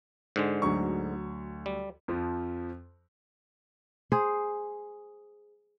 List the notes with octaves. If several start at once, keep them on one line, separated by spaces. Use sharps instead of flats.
G#2 D3 G#3
D2 F#3 C#6
G3
F2 F3
G#4 C5